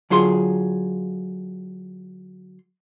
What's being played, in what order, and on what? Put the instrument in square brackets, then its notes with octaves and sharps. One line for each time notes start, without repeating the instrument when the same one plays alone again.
[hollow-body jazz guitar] D3 F#3 F4 G#4 C6